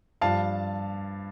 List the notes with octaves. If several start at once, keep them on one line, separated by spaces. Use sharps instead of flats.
G2 F3 F5 A5